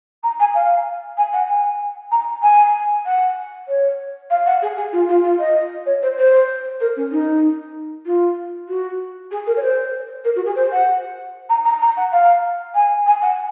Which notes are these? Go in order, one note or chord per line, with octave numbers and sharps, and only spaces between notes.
A#5
G#5
F5
G#5
F#5
G#5
A#5
G#5
F#5
C#5
F5
F#5
G#4
G#4
F4
F4
F4
D#5
C#5
C5
C5
A#4
C#4
D#4
F4
F#4
G#4
A#4
C#5
C5
A#4
F#4
G#4
C5
F#5
A#5
A#5
A#5
F#5
F5
G#5
G#5
F#5